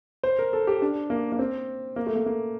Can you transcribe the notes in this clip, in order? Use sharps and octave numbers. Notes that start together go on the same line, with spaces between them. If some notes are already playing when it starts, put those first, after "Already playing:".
C5
A#4
A4
G4
D4
A#3
A#3
C4
A#3
A3
A#3
A#3